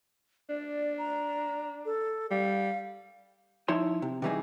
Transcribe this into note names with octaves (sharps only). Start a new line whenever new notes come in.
D4 D5
A#5
A4
G3 F5
F3 D#4 E4 C#5 C6
C3
C3 D#3 E3 G3 D#4 G#4